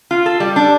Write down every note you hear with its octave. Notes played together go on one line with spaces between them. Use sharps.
F4
A4
G3
D4